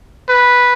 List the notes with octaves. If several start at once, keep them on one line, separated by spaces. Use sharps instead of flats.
B4